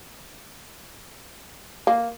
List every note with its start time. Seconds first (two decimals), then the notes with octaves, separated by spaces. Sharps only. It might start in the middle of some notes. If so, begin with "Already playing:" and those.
1.87 A#3